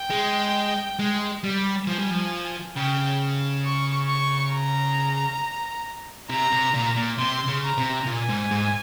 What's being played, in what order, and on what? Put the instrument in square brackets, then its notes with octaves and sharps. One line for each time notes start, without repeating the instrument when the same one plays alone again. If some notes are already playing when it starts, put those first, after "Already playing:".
Already playing: [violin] G5
[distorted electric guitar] G#3
G#3
G3
[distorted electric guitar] F3 [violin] G#5
[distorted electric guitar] G3
F3
[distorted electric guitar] C#3 [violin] G5
[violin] C#6
C#6
A#5
[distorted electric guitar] C3 [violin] A#5
[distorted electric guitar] C3
A#2
A#2
[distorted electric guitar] C3 [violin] C6
[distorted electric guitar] C#3
[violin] A#5
[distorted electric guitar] C3
[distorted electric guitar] A#2 [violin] G#5
[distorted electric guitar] G#2
G#2